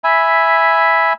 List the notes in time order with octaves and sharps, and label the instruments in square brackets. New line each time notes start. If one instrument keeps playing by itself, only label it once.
[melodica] E5 G#5 B5